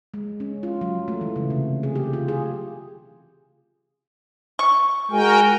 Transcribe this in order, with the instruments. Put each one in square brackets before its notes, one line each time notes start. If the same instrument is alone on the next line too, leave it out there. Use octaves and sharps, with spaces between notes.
[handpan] G#3
C#4
F4
F#3
A3
E3
C#3
C3
G#4
G4
F4
G#4
[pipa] C#6
[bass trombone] G#3 [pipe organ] F#4 A#4 G5 [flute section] G#5